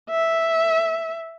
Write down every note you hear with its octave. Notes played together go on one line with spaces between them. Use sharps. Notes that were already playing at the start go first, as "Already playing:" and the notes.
E5